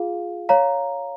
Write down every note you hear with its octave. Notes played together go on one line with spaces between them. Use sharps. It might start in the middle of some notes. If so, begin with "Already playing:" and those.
Already playing: F4 G#4 F5
C#5 F5 A#5